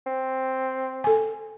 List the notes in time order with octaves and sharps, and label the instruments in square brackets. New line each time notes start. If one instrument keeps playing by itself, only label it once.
[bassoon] C4
[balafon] A4 G#5